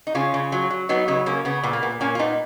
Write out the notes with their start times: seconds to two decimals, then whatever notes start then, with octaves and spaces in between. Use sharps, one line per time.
0.07 D#4
0.15 C#3 C#4 F4
0.34 C#3
0.52 F#3
0.71 F#3
0.89 F#3 B3 D#4
1.08 C#3 B3 D#4
1.26 C#3 A#3 C#4
1.45 C#3 B3
1.63 A#2 B3
1.73 A#3
1.82 A#2 B3
2.01 A#2 A#3 C#4
2.15 F4
2.19 A#2 B3 D#4